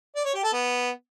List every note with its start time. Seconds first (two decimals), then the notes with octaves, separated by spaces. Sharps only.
0.15 D5
0.25 C#5
0.34 G4
0.44 A4
0.53 B3